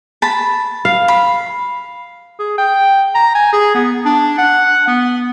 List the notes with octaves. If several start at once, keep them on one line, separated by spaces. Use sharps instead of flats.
A5 B5
F5
B5
G#4
G5
A#5
G#5
G#4
B3
D4
F#5
B3